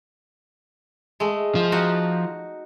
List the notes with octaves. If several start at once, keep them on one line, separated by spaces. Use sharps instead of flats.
G#3 A3
F3
D#4 F#4